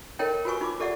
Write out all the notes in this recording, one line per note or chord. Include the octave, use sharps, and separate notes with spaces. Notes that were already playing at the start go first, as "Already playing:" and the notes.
D#4 A4 A#4 C#5 D#5 G5
F4 F#4 B4 G#5 C#6
D#4 F4 D6
G4 A4 D5 E5 F#5